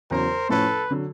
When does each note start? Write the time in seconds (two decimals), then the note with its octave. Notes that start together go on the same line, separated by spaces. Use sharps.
0.10 E2 C#3 F#3 A#4 C5
0.49 A2 F3 A3 C#4 E4 A4 B4
0.91 D3 F#3